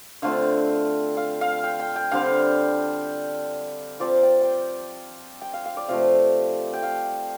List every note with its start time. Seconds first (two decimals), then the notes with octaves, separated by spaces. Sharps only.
0.22 D3 A3 C4 F4 F5
1.17 F5
1.41 F5
1.64 G5
1.80 G5
1.96 G5
2.11 D3 G3 C4 F5
4.00 F3 C4 F4 D5
4.23 G5
4.41 G5
5.42 G5
5.54 F5
5.65 F5
5.77 D5
5.88 C3 F3 A3 F5
6.73 G5
6.83 F5